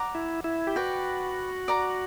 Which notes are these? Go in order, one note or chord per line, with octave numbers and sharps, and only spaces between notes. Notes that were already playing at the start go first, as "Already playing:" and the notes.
Already playing: D5 F#5 A#5 D6
E4
E4
G4
F#4 B4 D5 G5
D5 A#5 D6